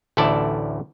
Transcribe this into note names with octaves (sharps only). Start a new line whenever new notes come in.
A1 D2 E4 A4 D5 A5